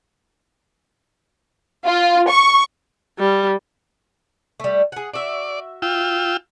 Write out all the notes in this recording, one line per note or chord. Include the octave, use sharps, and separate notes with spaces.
F4
C#6
G3
G3 A3
G#4 F#5
F#4 D5 E5
F4 G5 E6